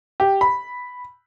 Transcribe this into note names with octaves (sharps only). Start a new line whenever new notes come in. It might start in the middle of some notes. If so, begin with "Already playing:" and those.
G4
B5